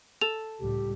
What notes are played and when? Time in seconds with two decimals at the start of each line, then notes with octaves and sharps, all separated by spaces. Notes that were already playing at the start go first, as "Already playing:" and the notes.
0.21 A4 F7
0.60 C#2 A2 G3 G4